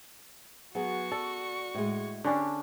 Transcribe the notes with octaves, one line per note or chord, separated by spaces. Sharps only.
F#3 B3 F#4 G#4 C#6
A4 D5
A2 G#3
D3 C#4 D4 G4